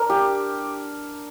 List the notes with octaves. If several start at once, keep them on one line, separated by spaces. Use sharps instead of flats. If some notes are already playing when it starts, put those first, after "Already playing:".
Already playing: D4 A#4
G4